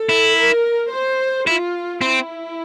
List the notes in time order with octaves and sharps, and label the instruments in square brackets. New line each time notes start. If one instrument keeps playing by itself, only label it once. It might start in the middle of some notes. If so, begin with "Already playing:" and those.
Already playing: [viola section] A4
[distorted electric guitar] E4
[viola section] A#4
C5
[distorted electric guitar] E4 [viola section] F4
[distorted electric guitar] C4 [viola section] E4